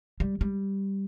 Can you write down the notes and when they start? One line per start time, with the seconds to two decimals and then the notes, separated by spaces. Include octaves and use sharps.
0.20 G3
0.41 G3